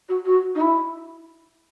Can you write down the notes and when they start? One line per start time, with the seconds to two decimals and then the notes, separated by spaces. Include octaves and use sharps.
0.08 F#4
0.25 F#4
0.55 D#4
0.60 E4